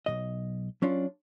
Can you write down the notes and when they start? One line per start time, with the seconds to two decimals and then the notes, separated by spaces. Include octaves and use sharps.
0.06 B1 A#2 D#5
0.82 F#3 C#4 D4 F4